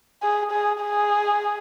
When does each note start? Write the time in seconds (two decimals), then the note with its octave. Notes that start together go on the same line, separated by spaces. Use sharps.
0.22 G#4
0.51 G#4
0.82 G#4